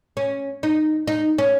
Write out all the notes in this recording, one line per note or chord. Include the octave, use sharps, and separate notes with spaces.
C#4
D#4
D#4
C#4